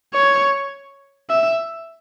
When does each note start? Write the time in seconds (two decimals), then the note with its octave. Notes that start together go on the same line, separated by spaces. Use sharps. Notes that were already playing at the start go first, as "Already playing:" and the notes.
0.14 C#5
1.29 E5